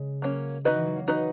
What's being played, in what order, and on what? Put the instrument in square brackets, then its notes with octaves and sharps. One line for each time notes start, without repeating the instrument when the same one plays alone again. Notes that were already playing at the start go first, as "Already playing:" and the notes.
Already playing: [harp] C#3 G#3
[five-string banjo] F#3 A#3 C#4
[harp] D#3 [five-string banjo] D#4 F#4 B4 D#5
[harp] E3
F#3
A#3
[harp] A#3 [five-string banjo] D#4 F#4 B4 D#5